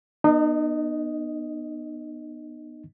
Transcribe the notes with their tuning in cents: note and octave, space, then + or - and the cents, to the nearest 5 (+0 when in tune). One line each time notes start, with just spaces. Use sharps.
B3 -20 D#4 -40 D#5 +0